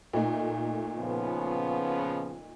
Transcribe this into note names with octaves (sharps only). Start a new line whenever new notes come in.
A#2 A3 D#4
C#3 F3 B3